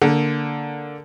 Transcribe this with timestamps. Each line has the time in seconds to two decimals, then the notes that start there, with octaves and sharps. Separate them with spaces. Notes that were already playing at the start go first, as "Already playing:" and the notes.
0.02 D3 A#3